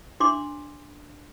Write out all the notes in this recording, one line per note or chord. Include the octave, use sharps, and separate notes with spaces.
D4 C6 D6